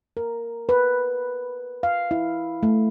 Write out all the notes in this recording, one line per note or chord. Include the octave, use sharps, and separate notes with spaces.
A#4
B4
F5
E4
A3